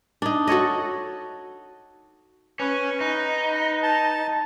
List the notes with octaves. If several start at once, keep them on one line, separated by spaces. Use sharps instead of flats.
D4 D#4
F#4 A4 C#5 D#5
C#4 B4
D#4
A5